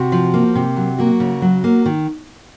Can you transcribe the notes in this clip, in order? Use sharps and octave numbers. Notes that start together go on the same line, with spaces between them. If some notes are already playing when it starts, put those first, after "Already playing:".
Already playing: C3 F#4
F3
A#3
C3
F#3
A#3 F#4
C#3
F#3
A#3
D#3